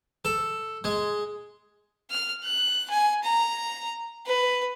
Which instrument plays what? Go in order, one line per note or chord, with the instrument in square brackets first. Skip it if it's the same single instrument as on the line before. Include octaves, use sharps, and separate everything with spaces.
[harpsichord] A4
G#3
[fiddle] F6
F#6
G#5
A#5
B4